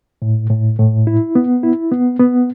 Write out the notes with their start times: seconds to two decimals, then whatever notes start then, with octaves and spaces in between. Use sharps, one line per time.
0.22 A2
0.50 A2
0.79 A2
1.07 E4
1.35 B3
1.63 E4
1.92 B3
2.19 B3